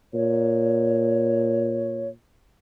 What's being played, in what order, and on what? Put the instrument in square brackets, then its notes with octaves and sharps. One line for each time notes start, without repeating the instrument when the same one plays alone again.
[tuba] A#2 [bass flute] C#5